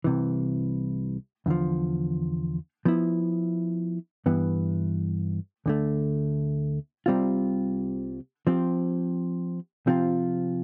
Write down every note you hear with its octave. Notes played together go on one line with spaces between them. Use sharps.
C2 C3 E3
E2 D3 F3
F3 B3 E4
G2 E3 B3
D2 D3 A3
C2 C3 G3 C4 F4
F3 C4 G4
C3 F3 C4 F4